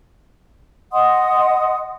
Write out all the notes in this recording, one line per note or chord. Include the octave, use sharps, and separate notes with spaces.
D#5 F#5 C6 D#6